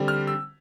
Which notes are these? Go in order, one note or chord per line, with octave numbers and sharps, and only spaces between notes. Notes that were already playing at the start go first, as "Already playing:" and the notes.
Already playing: D3 G3 C4
F6
E6